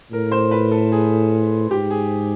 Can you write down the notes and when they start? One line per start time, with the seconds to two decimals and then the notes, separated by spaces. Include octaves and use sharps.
0.12 A2 A#4
0.32 C5
0.51 B4
0.71 A4
0.92 G#4
1.70 G#2 G4
1.91 G#4